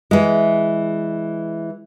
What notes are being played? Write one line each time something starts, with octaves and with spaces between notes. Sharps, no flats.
E3 G#3